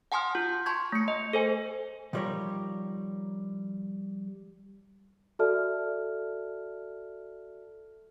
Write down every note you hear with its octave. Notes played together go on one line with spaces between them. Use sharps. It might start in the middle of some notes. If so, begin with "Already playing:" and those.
F#5 G#5 A5 C6 D#6 F6
F4
A5 C6 C#6 G#6
A3 C#7
D#5
A4 C5 G#5
D#3 F3 G3 A#4 C#5
F#4 A4 D5 E5 A5 F6